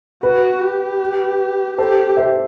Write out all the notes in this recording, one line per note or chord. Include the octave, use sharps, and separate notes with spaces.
F#4 B4
G4
G4 A4 C5
C5 E5